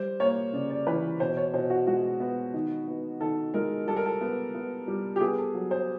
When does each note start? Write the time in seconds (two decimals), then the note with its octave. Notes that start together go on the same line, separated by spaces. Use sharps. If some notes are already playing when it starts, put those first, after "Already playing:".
Already playing: G3 C5
0.20 A#3 C#5
0.53 C#3 D5
0.70 D5
0.87 E3 B4
1.20 B2 C5
1.37 C#5
1.54 B2 C5
1.70 F#4
1.87 G#3 F#4
2.20 B3
2.54 D#3
2.88 B3
3.21 D#3 A4
3.54 G#3 A#4
3.87 G3 A4
3.96 A#4
4.06 A4
4.21 B3
4.55 B3
4.88 G3
5.16 G4
5.21 B3 G#4
5.38 A4
5.54 F#3
5.71 C5